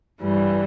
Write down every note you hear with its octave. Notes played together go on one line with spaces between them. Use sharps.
G2 E3 G3